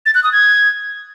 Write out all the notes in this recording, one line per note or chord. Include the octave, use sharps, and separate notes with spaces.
A6
F#6
D#6
G#6